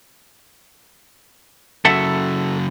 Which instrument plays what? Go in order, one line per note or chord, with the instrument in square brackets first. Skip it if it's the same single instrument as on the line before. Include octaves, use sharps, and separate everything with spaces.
[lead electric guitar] C#3 F#3 [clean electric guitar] A4 E5 F#5